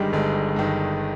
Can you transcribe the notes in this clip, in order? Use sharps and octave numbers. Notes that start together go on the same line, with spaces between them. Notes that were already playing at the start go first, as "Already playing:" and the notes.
Already playing: G1 G2 D#3 G3 G#3 D4 D#4
G1 G#3
G2 D#3